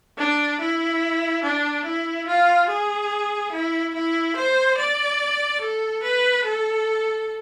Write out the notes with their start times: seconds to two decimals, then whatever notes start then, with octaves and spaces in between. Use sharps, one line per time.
0.18 D4
0.60 E4
1.43 D4
1.85 E4
2.27 F4
2.68 G#4
3.52 E4
3.94 E4
4.36 C5
4.77 D5
5.60 A4
6.02 B4
6.44 A4